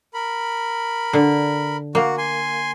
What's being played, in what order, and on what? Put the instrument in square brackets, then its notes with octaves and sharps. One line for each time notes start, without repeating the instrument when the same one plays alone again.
[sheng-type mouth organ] A#4 B5
[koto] D3
[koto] A#3 [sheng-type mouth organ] F#4
[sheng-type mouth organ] G#5 C6